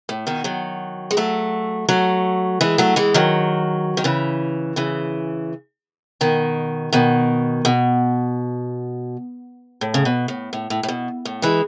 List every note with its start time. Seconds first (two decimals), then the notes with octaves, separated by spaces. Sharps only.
0.09 A2
0.27 B2 D#3
0.44 D#3 F#3
1.11 G#3
1.17 F#3 A3
1.89 F#3 A3
2.61 E3 G#3
2.78 F#3 A3
2.96 E3 G#3
3.14 D#3 F#3
3.97 D#3
4.04 C#3 E3
4.76 C#3 E3
6.21 B2 D#3
6.93 B2 D#3
7.65 B2
9.81 A2
9.94 C#3
10.05 B2
10.28 A2
10.53 A2
10.70 A2
10.83 A2
10.88 B2
11.25 A2
11.42 E3 G#3